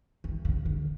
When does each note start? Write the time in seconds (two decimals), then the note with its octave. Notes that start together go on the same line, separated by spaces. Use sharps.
0.24 D#3
0.45 C#3
0.65 D3